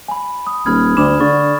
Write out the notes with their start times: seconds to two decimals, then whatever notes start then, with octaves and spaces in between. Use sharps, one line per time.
0.08 G#5 B5
0.47 D#6
0.66 D#1 B5 F6 G#6
0.97 D2 B5 D6 E7
1.20 D3 C#6 A6